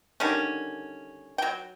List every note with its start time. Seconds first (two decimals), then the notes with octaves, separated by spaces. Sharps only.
0.20 D3 D#3 G3 C#4
1.38 F#3 G5